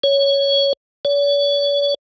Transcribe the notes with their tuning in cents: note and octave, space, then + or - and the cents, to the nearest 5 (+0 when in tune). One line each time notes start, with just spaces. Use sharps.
C#5 +5
C#5 +45